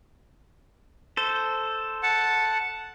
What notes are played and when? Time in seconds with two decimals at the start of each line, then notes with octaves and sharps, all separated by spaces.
1.17 A4 C5
2.03 F#5 A5